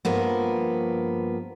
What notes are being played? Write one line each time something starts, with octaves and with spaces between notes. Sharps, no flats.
G2 F3 A#3 B3